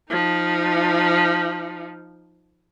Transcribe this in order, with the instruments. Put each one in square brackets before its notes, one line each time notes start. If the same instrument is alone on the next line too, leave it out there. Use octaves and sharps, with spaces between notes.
[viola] F3 D#4